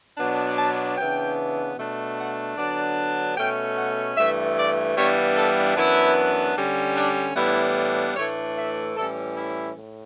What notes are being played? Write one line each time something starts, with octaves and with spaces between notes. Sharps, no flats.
B2 F#3 B3 D4
A5
C#3 E3 B3 D4 G5
B2 A3 D4
F#5
D3 F#3 B3 D4 D5
B2 A3 C#4 G5
F#5
G2 E3 A3 E5
D5
G2 E3 G3 B3 D4 C#5
A4
F#2 E3 B3 D4 E4
D3 G3 C#4
D4
A2 E3 G3 B3 D4 E4
A2 E3 A3 D4 C#5
E5
A2 E3 G3 C#4 A4
E4
A2